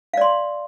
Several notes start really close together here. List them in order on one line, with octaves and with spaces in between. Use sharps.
F5 D5 C6